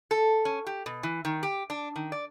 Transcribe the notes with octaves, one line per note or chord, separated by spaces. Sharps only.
A4
C#4
G4
B2
E3
D#3
G4
D4
D#3
D5